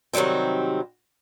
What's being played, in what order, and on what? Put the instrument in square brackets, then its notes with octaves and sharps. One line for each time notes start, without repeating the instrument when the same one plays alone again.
[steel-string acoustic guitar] C3 D#3 F#3 G3 C4